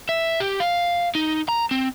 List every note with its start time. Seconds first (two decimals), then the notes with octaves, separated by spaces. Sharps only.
0.09 E5
0.40 G4
0.60 F5
1.15 D#4
1.49 A#5
1.71 C4